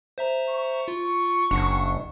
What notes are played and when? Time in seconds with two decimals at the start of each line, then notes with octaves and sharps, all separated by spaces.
0.18 C5 E5 A#5
0.49 C#6
0.88 F4
1.51 F#1 D4 F#5